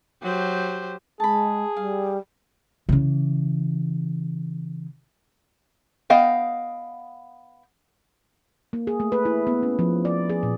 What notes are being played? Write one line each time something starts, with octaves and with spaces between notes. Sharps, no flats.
F#3 G4 C5
G#3 G#4 A5 B5
G3 F5
C#3 E3
B3 D#5 F5 G5
A#3
G#4
A3
B4
E4
B3
C#4
F3
D5
G#4
A#2